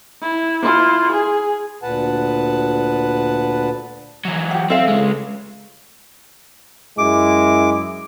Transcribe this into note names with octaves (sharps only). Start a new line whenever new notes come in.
E4
E4 F4
G#4
D2 A#2 B4 F#5 A5
E3 F#3
G4 F#5
C4 A4 E5 F5
C#2 G#3
F#2 G#3 E4 D6